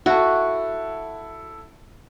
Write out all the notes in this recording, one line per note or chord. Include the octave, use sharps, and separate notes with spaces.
E4 F#4 A4